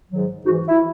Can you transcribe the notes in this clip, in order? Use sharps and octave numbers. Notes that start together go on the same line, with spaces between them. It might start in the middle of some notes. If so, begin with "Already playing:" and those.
G#2 D#3 F#3
G#2 E3 D#4 F#4
E4